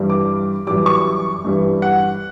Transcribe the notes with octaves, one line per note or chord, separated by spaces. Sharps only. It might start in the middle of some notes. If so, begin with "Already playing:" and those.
Already playing: G2 E3 G3
D6
F#2 E3 G3 D6
C#6
G2 E3 G3
F#5